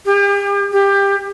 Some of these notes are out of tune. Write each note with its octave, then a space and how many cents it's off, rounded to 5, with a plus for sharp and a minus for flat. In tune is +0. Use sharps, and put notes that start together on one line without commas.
G4 +40
G4 +20